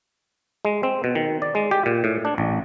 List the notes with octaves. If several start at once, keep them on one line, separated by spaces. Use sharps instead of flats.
G#3
C4
B2
D#3
D5
G#3
G4
A#2
A2
D4
A1